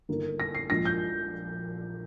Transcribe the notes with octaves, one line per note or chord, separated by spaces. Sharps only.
G1 G2 D#3 A#3
A#6
C7
A#1 A#2 G#3 D4 F4 A#6
G6